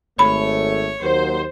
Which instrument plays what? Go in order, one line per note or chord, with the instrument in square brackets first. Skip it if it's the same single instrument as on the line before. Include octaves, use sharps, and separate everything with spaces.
[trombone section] G#1 A3 [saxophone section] C#5 [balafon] B5
[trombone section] D#2 F#3 A#3 [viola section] C5